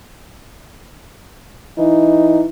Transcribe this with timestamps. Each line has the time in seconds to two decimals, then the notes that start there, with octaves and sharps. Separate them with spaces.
1.78 E3 D#4